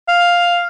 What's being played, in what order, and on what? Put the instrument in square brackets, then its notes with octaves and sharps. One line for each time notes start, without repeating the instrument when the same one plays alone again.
[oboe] F5